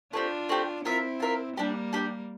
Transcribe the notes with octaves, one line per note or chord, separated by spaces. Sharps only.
A3 C4 D4 F4 G4
A3 C4 G4
C4 E4 F4 A#4 E5
F4 A#4 E5
G3 A#3 D4 G4 D5
D4 G4 D5